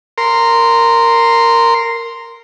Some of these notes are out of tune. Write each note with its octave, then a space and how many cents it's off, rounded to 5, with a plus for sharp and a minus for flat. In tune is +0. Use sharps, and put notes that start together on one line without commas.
A#4 -10 C6 +0